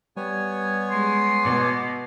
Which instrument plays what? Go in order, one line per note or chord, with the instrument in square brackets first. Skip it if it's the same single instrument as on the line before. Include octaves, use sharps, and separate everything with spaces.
[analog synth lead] G3 [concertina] B3 C#5 G#5
[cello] G#3 [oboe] C6
[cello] B2 [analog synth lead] D6